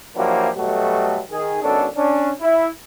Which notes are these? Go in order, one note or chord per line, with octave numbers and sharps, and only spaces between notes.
F3 F#3 A#3 D4 E4 G4
B2 F#3 G3 A3
D#3 G#4
G#1 B2 C#4 D4 A4
C#4 D4
E4